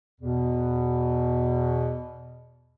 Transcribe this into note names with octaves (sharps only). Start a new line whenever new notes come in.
E2 B2